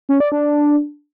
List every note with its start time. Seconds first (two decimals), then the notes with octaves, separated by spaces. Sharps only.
0.09 C#4
0.20 D5
0.32 D4